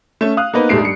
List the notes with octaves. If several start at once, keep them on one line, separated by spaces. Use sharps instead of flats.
A3 C#4
F5 D#6 F#6
A#3 B3 D#4 B4 C5
D#1 G#2 G3 A3 C7 D7
G2 C#7